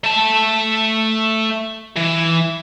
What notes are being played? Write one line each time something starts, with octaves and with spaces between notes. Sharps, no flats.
A3 A5
E3